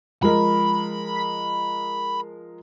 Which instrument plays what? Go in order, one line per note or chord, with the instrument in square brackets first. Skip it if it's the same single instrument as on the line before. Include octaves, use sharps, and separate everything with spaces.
[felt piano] F3 G#3 A#4 [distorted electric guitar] B5